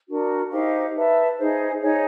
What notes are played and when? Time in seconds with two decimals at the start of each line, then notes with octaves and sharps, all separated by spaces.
0.08 D4 F#4 A#4
0.51 D#4 G4 C5 F5
0.94 B4 E5 A5
1.38 D#4 G#4 C5
1.81 D#4 G#4 C#5